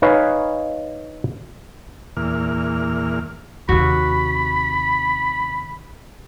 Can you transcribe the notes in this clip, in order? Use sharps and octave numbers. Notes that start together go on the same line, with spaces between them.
D#4 B4 C#5 F5 G#5
E2 A#2 F6
D#2 C3 F#4 B5